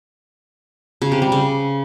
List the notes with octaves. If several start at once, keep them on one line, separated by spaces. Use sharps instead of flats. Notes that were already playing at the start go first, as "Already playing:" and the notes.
C#3
C3
G3
C#3